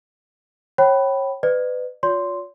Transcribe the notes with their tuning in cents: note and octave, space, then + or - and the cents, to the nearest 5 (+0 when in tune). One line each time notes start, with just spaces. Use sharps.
C#5 -30 G5 -25 B5 +0
B4 +30 D5 +40
F4 +35 C#5 +45 C6 -5